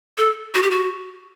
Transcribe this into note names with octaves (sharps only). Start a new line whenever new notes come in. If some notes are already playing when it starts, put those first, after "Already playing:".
A4
F#4
G4
F#4